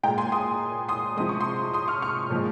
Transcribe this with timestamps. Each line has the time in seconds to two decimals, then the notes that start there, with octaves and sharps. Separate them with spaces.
0.04 G#3 G5 A#5
0.07 A#2
0.18 G#5 C6
0.32 C6 D#6
0.89 C6 D#6
1.17 C3 F3 G#3 D#6
1.29 C#6
1.40 C6 D#6
1.74 C6 D#6
1.88 C#6 F6
2.02 C#6 F6
2.30 A#2 F3 G#3